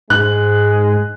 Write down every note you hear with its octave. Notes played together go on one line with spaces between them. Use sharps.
G#2 G#3 F#6